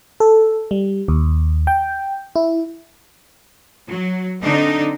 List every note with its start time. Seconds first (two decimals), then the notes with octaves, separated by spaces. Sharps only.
0.20 A4
0.71 G3
1.08 D#2
1.67 G5
2.36 E4
3.89 F#3
4.42 D3 C4 D4 D#4